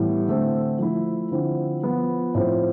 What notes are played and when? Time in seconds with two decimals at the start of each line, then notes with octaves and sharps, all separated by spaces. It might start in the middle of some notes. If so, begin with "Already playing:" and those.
Already playing: A2 E3 G3 B3
0.28 D3 A3 C4
0.79 F3 A3 E4
1.31 D3 F3 C4 E4
1.83 F3 B3 F4
2.35 A2 F3 C4